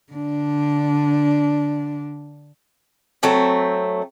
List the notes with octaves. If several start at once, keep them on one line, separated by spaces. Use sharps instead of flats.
D3 D4
F#3 A3 C4